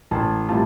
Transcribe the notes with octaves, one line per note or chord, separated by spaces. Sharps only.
A1 A5
A2 G3 C4 F4 A5